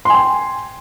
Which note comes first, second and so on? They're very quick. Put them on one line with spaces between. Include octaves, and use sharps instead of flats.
C6 G#5 G5